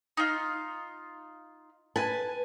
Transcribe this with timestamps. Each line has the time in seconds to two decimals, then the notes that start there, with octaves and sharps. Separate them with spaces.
0.17 D#4 F4
1.96 B4 G#5 A5